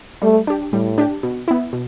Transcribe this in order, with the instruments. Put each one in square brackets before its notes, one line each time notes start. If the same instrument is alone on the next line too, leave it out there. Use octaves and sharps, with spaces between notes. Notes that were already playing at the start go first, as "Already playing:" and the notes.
[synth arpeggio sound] G3 [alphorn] A3
[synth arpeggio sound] D4 G4
[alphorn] A2 [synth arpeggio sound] G3
[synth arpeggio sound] D4 G4
B2
B3 E4
B2